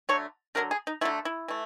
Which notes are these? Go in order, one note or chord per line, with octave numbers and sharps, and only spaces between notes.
D3 F#3 A3 C#5
D3 F#3 A3 A#4
G#4
D#4
D3 F#3 A3 E4
E4
E3 A3